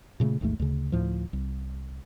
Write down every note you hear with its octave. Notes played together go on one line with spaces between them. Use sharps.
A#2 C#3 G3 A3
A1 D#2 G#2 A3
D2 C#3
D2 A2 F3
C2